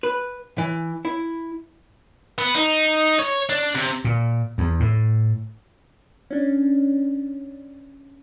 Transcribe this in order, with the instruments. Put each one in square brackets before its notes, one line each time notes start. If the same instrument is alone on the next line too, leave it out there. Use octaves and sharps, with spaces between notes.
[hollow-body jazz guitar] B4
E3
E4
[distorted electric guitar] B3
D#4
C#5
D4
C3
[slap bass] A#2
E2
A2
[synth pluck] C#4 D4